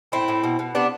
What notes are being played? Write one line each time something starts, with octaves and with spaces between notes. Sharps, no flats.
A2 C4 E4
A2
B2
B2
C3 B3 D4